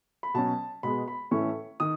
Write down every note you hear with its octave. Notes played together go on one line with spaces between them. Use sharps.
B5
B2 F#3 C#4 A5
B2 G#3 B3 B5
B5
A2 E3 A3 C#4 C#6
D#3 D#6